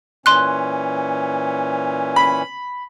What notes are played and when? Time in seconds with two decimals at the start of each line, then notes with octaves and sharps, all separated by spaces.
0.26 A#2 E3 C#4 C6 F#6
2.16 B5